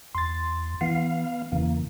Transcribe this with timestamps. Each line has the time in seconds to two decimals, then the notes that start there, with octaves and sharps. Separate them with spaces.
0.15 E2 C6 A6
0.81 E3 B3 F5
1.52 E2 C#3 E3 A#3